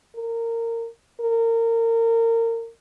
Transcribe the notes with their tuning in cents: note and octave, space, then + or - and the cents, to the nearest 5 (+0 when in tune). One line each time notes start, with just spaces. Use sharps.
A#4 -20
A#4 -30